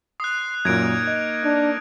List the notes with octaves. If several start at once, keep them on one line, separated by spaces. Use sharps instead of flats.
C6 D#6 F#6
F#2 A#2 A#3 D#4 G#6 D7
D#5
D4